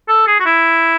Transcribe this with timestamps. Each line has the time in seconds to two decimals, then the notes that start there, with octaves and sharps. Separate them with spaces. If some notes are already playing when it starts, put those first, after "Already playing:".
0.08 A4
0.27 G#4
0.40 F#4
0.45 E4